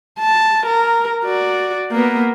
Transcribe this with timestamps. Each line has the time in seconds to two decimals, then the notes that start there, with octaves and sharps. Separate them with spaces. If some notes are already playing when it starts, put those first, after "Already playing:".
0.19 A5
0.66 A#4
1.24 F#4 D5
1.91 A#3 B3